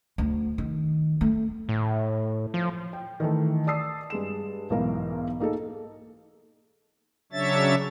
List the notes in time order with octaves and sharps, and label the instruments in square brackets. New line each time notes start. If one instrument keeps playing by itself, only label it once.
[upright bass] D2
D#3
A3
[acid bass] A2
F3
[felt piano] G5
D#3 E3 A3
D5 A5 D#6 E6 C7
G2 G#3 E7
B1 G#2 E3 A#4 F5
A#3 D#4 G#4 A4
[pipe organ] C#3 F#3 D4 C#5 E5 A6